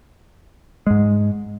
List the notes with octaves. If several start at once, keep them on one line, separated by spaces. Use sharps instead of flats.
G#2 G#3